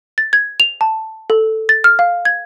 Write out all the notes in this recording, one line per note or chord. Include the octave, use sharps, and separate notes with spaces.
A6
G#6
F7
A5
A4
A6
F6
F5
G#6